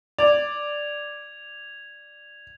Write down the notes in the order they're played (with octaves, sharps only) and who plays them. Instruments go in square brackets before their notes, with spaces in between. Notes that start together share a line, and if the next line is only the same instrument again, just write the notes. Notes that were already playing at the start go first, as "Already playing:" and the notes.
[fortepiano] D5 [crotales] G#6 F7